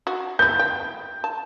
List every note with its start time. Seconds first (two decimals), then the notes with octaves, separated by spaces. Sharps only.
0.07 F#4
0.39 B3 E4 G6
0.59 G5
1.24 A5